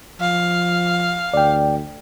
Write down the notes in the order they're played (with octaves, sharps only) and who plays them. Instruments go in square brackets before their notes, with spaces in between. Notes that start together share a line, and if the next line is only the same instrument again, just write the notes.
[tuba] F3 [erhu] F5
[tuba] D2 [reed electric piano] D5 G5